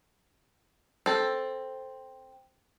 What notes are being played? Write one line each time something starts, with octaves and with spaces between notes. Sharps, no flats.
C4 A4